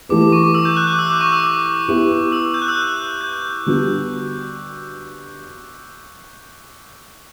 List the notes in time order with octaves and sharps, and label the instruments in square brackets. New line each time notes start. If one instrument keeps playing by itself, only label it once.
[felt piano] E3 A3 E4 G4 B4 [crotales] D6
[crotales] D6
C#6
D6
E6
G6
F#6
F#6
D6
E6
D6
C#6
E6
D6
[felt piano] B3 E4 G4 B4
[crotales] E6
G6
F#6
E6
F#6
G6
[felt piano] D3 G3 B3 F#4